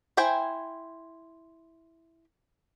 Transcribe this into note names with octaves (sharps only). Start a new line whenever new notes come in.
E4 C5 G5 G#5